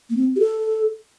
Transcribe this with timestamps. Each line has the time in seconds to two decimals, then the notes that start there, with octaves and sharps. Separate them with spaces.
0.10 A#3
0.17 C4
0.36 G4
0.40 A4